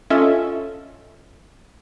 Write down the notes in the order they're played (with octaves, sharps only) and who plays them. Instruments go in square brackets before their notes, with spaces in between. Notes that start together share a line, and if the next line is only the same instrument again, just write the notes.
[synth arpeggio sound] C#4 F4 A4 D#5 E5